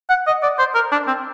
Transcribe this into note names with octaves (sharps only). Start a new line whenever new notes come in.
F#5
D#5
D5
C5
A#4
D4
C4